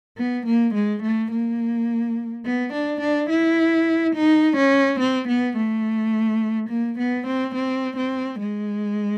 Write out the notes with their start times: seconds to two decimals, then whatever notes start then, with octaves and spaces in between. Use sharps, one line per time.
0.18 B3
0.46 A#3
0.74 G#3
1.02 A3
1.31 A#3
2.45 B3
2.73 D4
3.01 D4
3.30 E4
4.15 D#4
4.57 C#4
5.00 C4
5.28 B3
5.57 A3
6.69 A#3
6.98 B3
7.27 C4
7.55 C4
7.97 C4
8.39 G#3